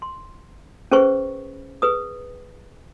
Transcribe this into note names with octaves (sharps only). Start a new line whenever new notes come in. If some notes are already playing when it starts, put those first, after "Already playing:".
C6
C#4 G#4 B4 C5 C#6
G#4 B4 D#6